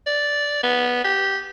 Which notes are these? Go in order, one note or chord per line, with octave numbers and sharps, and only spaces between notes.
D5
B3
G4